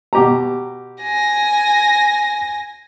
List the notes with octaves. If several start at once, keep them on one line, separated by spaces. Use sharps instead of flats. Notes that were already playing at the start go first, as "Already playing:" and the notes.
B2 G4 A#5
G#5 A#6